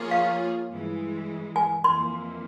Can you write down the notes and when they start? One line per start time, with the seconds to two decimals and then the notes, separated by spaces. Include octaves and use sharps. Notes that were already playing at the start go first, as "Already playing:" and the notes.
Already playing: F3 A#3 F4 G#4 C#5
0.11 F5
0.70 G2 E3 G#3
1.56 G#5
1.84 F2 E3 A#3 C6